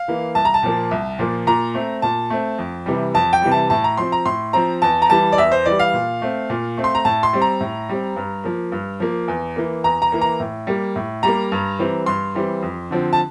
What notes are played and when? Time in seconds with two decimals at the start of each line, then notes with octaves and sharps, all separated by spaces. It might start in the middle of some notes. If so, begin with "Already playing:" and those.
Already playing: F5
0.08 E3 A#3
0.35 C2 A5
0.45 A#5
0.54 A5
0.63 A#2 F3 A#3
0.91 C2
1.19 A#2 F3 A#3
1.47 A#2 A#5
1.74 A3 C4
2.02 A#2 A5
2.30 A3 C4
2.59 F2
2.86 C3 E3 G3
3.15 F2 A5
3.33 G5
3.42 C3 E3 G3
3.52 A5
3.70 A2 A5
3.84 A#5
3.97 F3 C4 C6
4.12 A#5
4.25 A2 C6
4.53 F3 C4 A#5
4.82 E2 A5
5.02 A#5
5.09 E3 G3 A5
5.32 D5
5.38 E2 E5
5.52 C5
5.66 E3 G3 D5
5.79 F5
5.94 A#2
6.22 A3 C4
6.50 A#2
6.78 A3 C4
6.84 C6
6.95 A#5
7.05 A2 A5
7.23 C6
7.33 G3 C4
7.42 A#5
7.61 A2
7.89 G3 C4
8.16 G2
8.44 F3 A#3
8.72 G2
9.00 F3 A#3
9.28 E2
9.56 E3 A#3
9.84 E2 A#5
10.02 A#5
10.12 E3 A#3
10.21 A#5
10.40 A2
10.67 G3 A#3
10.96 A2
11.23 G3 A#3 A#5
11.52 G2
11.79 E3 G3 C4
12.06 G2 C6
12.35 E3 G3 C4
12.62 F2
12.91 D3 F3 C4
13.13 A5